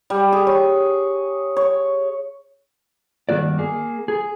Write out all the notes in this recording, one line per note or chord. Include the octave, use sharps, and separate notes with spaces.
G3
G#4
C#5
C#5
G2 D#3 A#3 F#4 D5
A#3 G#4
G#4